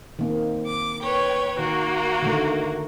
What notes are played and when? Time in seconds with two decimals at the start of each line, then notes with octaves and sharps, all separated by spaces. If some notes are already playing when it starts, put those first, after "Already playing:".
0.19 D#3 A#3 C4
0.66 D6
1.03 B4 C#5 G5
1.59 D#3 A#3 F#4
2.22 D3 D#3 A3